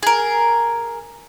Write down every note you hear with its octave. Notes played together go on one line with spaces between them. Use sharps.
G#4 A#4